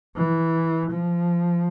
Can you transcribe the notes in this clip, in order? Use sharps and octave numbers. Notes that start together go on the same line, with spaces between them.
E3
F3